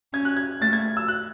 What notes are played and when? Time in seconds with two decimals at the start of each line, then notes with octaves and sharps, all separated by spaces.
0.13 C#4 G#6
0.25 F#6
0.37 G#6
0.61 A3 A6
0.73 G#6
0.97 E6
1.08 F#6